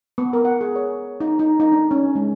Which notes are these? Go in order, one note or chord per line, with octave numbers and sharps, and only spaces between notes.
B3
A#4
F#5
G#4
C#5
D#4
D#4
D#4
D4
C#4
G#3